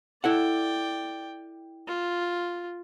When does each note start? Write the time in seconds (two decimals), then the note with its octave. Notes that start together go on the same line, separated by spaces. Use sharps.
0.24 E4 A4 D5 F#5 G5
1.88 F4